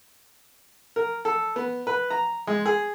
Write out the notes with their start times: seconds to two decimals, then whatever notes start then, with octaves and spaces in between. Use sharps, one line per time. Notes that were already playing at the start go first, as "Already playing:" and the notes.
0.96 A#4
1.25 A4
1.56 B3
1.87 B4
2.10 A#5
2.47 G#3
2.66 G#4